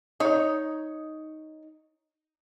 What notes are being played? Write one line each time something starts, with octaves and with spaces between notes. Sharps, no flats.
D#4 C#5